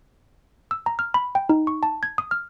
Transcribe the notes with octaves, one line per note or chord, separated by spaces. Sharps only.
E6
A#5
F6
B5
G5
D#4
C#6
A5
G#6
D#6
F6